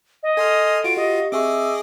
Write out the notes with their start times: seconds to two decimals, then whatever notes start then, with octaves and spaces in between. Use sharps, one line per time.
0.23 D#5
0.37 A4 G#5 C6 F6
0.84 F4 F#4 D7
0.97 G4 D#5
1.32 C4 G#4 D#5 E5 C#6 D6 E6